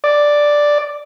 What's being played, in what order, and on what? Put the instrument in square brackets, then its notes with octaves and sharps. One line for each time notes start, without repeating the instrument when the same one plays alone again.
[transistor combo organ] D5